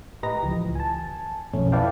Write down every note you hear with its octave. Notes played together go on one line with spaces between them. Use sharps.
A2 G4 B4 D#5 A#5 A#6
C#2 E3 F3
G#5 A5
B1 F2 F3 A3 C#4
E4 B4 D5 F5 G5 A5